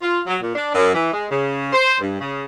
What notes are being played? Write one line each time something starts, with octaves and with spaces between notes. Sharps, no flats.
F4
F#3
A#2
D4
F#2
E3
G#3
C#3
C5
G2
C#3